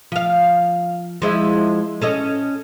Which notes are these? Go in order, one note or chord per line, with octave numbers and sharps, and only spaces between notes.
F3 F5
F3 G#3 E4
C#4 A4 D#5